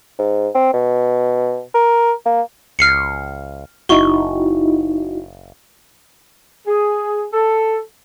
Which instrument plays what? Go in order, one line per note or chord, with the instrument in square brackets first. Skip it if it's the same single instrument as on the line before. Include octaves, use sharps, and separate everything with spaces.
[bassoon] G#2
C4
B2
A#4
A#3
[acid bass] C#2 [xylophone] F6 C7 C#7
[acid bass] F#1 [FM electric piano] D#4 E4 F#4 [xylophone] C#6 G7
[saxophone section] G#4
A4